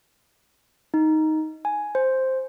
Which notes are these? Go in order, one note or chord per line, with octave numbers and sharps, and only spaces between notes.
D#4
G#5
C5